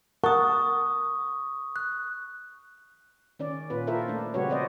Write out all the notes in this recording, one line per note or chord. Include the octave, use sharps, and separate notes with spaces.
A#4 F#5 A5 C#6 D#6
F#6
D#3 C#4 D5
A#2 C#4 F4 B4
E4 F4 A4 A#4 C5 E5
A3 D4
C#3 G3 F#4 G4 B4 C#5
F3 C4 C5 D5 D#5